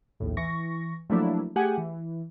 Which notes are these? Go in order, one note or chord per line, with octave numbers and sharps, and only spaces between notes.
A#1 D#2 A2
E3 C#6 A#6
F3 F#3 A3 A#3 D4 E4
A3 G4 G#4 F#5 G#5
E3